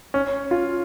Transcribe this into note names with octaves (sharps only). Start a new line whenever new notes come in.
C#4
F4